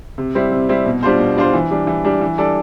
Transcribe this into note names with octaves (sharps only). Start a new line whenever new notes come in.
C3
G3 C4 E4
C3
G3 C4 E4
B2
G3 D4 F4 C5
B2
G3 D4 F4 C5
E3
G3 D4
E3
G3 D4
E3
G3 D4 A4 D5